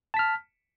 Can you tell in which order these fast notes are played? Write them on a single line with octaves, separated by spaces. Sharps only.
A5 B6 F6